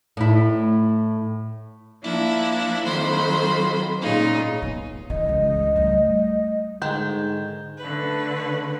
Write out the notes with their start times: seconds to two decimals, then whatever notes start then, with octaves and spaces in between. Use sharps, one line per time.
0.17 A2 E4
2.03 F3 A#3 D4 E4
2.86 F2 D#3 F#3 C5 B5
4.02 A#2 C#3 D#4 F4
4.62 B3
5.10 E3 D#5
5.29 C#2
5.76 G3 A3
6.82 G#2 D3 D#3 G#3 G6
7.78 D3 A3 B4